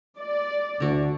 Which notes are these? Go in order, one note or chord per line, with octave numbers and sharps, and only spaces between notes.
D5
D2 D3 F#4